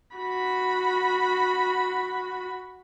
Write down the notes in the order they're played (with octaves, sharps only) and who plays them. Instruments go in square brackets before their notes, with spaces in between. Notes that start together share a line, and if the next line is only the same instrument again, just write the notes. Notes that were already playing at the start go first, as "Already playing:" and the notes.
[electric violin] F#4 B5